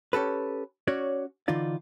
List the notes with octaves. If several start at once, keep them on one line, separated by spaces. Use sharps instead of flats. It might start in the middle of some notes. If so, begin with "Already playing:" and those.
C#4 G4 A4 B4
C#4 F#4 C#5 D5
D3 E3 D#4 F4 D5